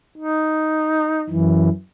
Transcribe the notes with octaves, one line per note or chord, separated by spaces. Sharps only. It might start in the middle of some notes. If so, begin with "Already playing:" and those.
D#4
F#2 E3